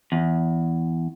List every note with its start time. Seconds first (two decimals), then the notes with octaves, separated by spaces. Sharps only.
0.12 E2